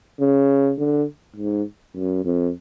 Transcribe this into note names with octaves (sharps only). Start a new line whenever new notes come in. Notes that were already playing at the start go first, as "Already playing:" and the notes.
C#3
D3
G#2
F#2
F2